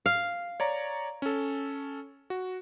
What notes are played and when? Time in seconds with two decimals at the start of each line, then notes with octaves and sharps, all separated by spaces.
0.06 F5
0.60 C#5 D5 A#5
1.22 C#4 A4
2.30 F#4